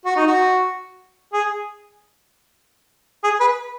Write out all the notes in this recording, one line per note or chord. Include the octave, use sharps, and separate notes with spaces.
F#4
D#4
F#4
G#4
G#4
B4